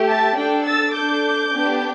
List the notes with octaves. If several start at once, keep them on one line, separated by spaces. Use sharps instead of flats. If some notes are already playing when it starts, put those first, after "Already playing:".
Already playing: A3 G4
E5 A5
D4 A4 D5 G5
E6 A6
D4 A4 D6 G6
B3 D4 G4